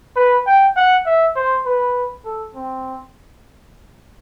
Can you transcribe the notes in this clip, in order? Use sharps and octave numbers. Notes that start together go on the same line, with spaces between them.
B4
G5
F#5
E5
C5
B4
A4
C4